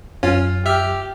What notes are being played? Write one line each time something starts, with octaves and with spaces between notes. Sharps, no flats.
F#2 C#4 F4
G4 E5 F6